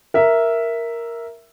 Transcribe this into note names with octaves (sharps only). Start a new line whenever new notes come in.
A#4 E5